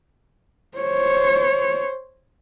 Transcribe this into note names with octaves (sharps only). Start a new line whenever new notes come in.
C5 C#5